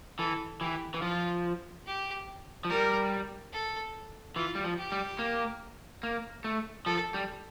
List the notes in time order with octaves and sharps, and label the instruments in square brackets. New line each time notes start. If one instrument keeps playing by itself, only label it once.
[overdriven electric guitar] E3 [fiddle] A4
[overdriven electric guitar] E3 [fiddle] G4
[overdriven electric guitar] E3
[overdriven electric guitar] F3 [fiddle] F4
[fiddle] G4
[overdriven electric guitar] F3
[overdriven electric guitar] G3 [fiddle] A#4
[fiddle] A4
[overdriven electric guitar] E3 [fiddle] F4
[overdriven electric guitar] G3
F3
[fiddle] G4
[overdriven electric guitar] G3
A#3
A#3
A3
[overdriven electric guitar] F3 [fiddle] A4
[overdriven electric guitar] G3